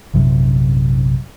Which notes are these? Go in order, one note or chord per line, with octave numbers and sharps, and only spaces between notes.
A#1 F#2 C3 F#3